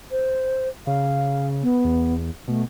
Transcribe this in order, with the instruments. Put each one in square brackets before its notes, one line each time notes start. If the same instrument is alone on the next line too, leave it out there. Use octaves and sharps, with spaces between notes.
[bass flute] C5
[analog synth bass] C#3 [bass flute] F5
[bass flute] B3
[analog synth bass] E2
[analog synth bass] B2 [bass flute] A3